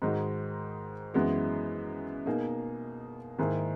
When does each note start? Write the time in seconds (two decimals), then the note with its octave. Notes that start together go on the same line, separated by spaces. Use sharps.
0.02 G#2 D#3 G#3 D#4 F#4
1.14 F#2 E3 G#3 B3 F#4
2.26 B2 A#3 D#4 G#4
3.38 G#2 D#3 A#3 E4 G#4